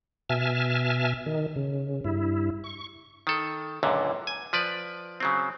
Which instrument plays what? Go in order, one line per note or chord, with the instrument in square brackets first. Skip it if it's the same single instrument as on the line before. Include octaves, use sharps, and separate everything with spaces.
[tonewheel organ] B2 E5 G#5 A5 F6
D#3
C#3
G2 E4
C#6
[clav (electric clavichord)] D#3 A4
C#2 F#2 A#2 D3
G#5
F3 B4 D5
C#3 F#3 C4